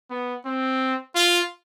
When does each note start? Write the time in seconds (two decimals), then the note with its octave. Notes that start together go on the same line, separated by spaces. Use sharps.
0.10 B3
0.46 C4
1.15 F4